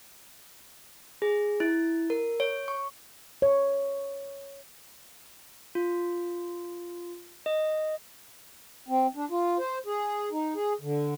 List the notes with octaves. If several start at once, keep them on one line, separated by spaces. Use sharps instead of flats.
G#4
E4
A#4
C#5
C#6
C#5
F4
D#5
C4
D4
F4
C5
G#4
D#4
G#4
D3